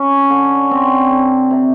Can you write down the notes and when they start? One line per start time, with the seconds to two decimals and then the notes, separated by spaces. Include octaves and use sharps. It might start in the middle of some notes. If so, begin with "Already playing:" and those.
Already playing: C#4
0.30 D3
0.71 C4
1.10 D3
1.50 C3